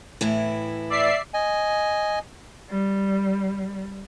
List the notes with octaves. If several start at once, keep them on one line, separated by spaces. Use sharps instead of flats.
A2 E3 E4
D5 E5 C7
D#5 G#5
G3